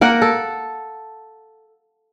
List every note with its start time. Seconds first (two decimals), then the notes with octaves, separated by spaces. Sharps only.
0.01 A#3 A#4 F#5
0.22 A4